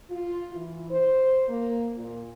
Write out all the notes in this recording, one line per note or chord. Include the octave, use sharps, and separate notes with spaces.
F4
E3
C5
A#3
A#2